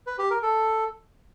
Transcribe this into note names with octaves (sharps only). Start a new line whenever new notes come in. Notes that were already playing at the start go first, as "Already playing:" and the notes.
B4
G4
A#4
A4